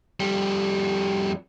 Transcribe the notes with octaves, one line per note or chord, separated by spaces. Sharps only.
F2 G3